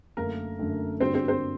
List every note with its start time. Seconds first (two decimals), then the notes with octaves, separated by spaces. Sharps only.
0.17 F#2 D3 A3 A#3 A#4
0.59 F#2 D3 A3
1.00 G2 D3 G3 A#3 C4 F#4 C5
1.14 C4 C5
1.28 C4 C5